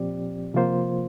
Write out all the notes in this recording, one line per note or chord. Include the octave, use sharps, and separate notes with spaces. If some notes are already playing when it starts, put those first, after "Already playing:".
Already playing: A#2 F3 C4 G4 D5
C3 F3 A#3 F4 C5